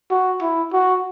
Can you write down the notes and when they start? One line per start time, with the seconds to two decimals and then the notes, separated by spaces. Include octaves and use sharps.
0.10 F#4
0.42 E4
0.73 F#4